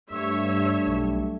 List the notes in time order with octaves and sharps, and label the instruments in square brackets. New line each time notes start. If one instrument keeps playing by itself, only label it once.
[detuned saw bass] G2 [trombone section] G3 A3 D4 [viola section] C#5 E5
[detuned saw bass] B1